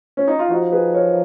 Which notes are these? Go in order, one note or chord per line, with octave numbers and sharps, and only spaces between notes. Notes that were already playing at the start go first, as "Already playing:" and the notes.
C#4
D#4
F4
F3 D#4 F#4
G#4 B4
A#4 C#5